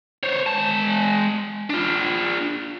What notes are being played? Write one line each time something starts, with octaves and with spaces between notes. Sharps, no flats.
C5 C#5
G#3 A5
D4 F4